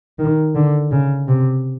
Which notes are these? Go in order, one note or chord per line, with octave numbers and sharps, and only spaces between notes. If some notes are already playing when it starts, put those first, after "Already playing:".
D#3
D3
C#3
C3